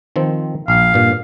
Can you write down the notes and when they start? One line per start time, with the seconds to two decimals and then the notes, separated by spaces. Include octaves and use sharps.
0.16 D#3 F3 C4
0.68 A#1 F5
0.94 G2 A#2